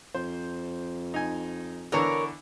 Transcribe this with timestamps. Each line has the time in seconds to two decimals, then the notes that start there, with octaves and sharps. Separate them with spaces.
0.14 F2 C5
1.14 D#4 G#5
1.92 D3 E3 B3 A#4 C#5